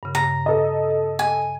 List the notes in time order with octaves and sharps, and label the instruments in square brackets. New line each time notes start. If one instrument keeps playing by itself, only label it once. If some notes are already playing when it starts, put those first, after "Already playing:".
[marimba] G2 C#3
[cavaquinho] A#5
[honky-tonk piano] A4 D#5
[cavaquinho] G#5